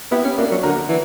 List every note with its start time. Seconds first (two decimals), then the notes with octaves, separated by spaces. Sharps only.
0.11 B3 E4 G4
0.25 C#4
0.38 A#3 D4 F#4
0.51 F#3
0.63 D3 F#4 A#4
0.89 E3